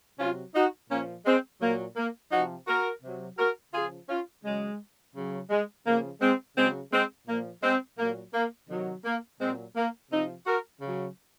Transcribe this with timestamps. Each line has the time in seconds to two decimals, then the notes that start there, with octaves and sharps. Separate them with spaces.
0.19 C3 F#3 C#4 F4
0.55 D#4 F#4
0.90 A#2 F3 A#3 C#4
1.26 G#3 C4
1.61 A#2 F#3 A#3
1.97 A#3
2.32 C3 F3 D#4 F#4
2.68 F#4 A#4
3.03 C3 F#3
3.38 F#4 A#4
3.74 C#3 F3 F4 G#4
4.09 C#4 F4
4.44 C#3 F#3 G#3
5.15 C#3 F#3
5.50 G#3
5.86 C#3 F3 A#3
6.21 G#3 C4
6.57 C#3 F#3 G#3 C4
6.92 G#3 C4
7.28 A#2 F3 A#3
7.63 G#3 C4
7.99 A#2 F#3 A#3
8.34 A#3
8.69 C3 D#3 F#3
9.05 A#3
9.40 A#2 F#3 G#3 C4
9.76 A#3
10.11 C3 F3 C4 D#4
10.47 F#4 A#4
10.82 C#3 F#3